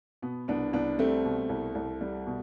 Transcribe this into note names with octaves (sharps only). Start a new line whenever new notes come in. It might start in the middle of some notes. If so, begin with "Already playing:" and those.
B2 B3
C2 B3 D4
C2 B3 D4
G3 A3 C4
B2
C2
C2
G3
B2